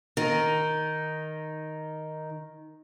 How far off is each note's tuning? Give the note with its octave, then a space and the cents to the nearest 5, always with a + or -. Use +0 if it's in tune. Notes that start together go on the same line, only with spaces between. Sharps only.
D#3 +0 D#4 +0